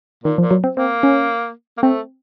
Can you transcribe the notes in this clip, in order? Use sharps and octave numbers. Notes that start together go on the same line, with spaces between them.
A#2 D#3
F3
A#2
F#3
C4
A#3 C4
C#4
A#3
A3 C4